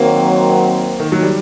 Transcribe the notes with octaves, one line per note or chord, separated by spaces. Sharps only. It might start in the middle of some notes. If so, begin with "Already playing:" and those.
Already playing: D#3 F#3 A#3 C4
D#3
F#3
G3